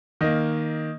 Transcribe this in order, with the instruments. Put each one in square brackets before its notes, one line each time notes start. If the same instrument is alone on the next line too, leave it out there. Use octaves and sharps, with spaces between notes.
[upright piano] D#3 A#3 D#5